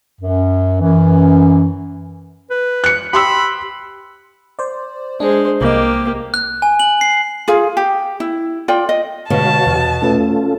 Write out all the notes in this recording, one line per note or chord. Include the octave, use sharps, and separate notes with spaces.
F#2
F#2 E3
B4
F#6 C#7
G4 B5 C6 E6
C5 D5
G#3 D4 C5
C2 A#3 G4 D#5
F#6
G#5
F#7
C7
F4 G#4 F5
G4
E4
F4 D5 G5
D#5
B2 D3 G#3 F#4 C#5 F5 A5 A#6
E2 C3
A3 C#4 F4 A4 B4 E5